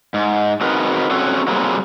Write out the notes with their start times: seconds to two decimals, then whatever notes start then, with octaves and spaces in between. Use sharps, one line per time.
0.14 G#2
0.61 C4 D#4 F#4 G#4 A#4 B4
1.11 C4 C#4 F#4 G#4 A4
1.48 F#3 G3 A#3 C4 G#4